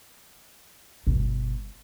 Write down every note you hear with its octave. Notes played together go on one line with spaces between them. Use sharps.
G1 B2